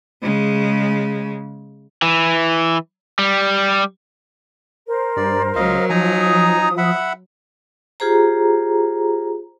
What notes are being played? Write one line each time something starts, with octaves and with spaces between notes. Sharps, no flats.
C#3 G#3
E3
G3
A#4 C5
G2 D5
C#2 F#3 D#5 F5
F3 D#4 G#5 A#5
D#6
E5 F#5 B5
F4 G4 G#4 C5 A#5